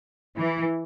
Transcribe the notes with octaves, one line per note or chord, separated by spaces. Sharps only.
E3